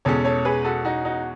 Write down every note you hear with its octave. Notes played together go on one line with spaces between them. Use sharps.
E2 B2 G#3 C#4 A4 C#5
A4 C#5
G#4 B4
F#4 A4
D#4 F#4
D#4 F#4